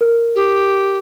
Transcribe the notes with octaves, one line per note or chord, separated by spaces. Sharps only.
A#4
G4